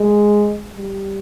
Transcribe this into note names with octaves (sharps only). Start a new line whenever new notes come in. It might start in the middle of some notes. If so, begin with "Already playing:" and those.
Already playing: G#3
G3